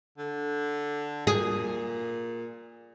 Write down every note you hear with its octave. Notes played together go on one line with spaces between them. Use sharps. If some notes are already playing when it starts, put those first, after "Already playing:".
D3
A#2 G#4